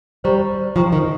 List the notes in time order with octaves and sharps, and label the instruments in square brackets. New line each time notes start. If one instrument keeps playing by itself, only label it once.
[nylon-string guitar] G3 [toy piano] G4 C5 G5 A#5
[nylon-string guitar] F3 [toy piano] G4 C5 G5 A#5
[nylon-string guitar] D#3